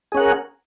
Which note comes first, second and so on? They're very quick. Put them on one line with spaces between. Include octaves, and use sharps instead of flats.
G#4 C#4 F#5 A#4